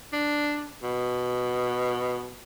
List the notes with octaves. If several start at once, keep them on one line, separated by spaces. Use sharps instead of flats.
D4
B2